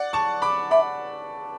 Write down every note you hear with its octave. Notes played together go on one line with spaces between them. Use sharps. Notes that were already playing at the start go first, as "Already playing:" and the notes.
Already playing: D5 F#5
A5 C#6
B5 D6
E5 B5 D6